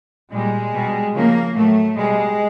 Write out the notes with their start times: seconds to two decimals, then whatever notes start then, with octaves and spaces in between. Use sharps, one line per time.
0.31 A#2 G3 G#3
0.73 B2 G3
1.14 C#3 F3 A#3
1.55 A2 F#3 A3
1.96 B2 G3 G#3